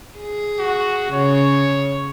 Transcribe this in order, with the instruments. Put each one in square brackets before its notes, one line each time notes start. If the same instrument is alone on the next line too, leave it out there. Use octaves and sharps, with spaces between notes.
[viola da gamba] G#4
[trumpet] F#4
[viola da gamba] C#3 [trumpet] C#5